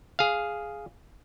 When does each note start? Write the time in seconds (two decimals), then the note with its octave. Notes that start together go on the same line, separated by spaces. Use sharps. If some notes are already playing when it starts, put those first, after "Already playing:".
0.19 G#4 F5